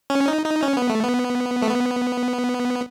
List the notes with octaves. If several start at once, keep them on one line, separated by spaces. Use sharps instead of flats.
C#4
D#4
D#4
C#4
B3
A3
B3
A3
B3